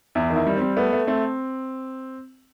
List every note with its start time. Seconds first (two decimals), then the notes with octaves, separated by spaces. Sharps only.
0.15 E2 E4
0.30 D#3
0.36 E4
0.47 G3
0.57 G3 C4
0.77 A3 B3
0.93 A3
1.07 A3 C4